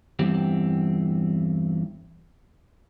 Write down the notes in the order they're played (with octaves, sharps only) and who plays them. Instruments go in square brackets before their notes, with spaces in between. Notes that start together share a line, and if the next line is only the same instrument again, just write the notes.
[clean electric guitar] E2 G2 E3 C4 G4